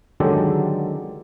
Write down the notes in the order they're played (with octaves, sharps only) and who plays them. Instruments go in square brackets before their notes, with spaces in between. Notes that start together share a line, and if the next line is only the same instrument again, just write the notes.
[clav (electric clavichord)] D3 D#3 F#3 G#3 G4 A4